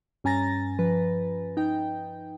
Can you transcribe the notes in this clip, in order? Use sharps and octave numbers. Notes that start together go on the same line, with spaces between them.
G2 C#4 G#5 A#5 A6 A#6
F3 B4
D#4 G5